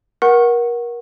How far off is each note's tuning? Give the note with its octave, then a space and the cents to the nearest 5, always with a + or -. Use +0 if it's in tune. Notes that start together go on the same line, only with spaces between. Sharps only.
A#4 +30 F#5 +0 C#6 -20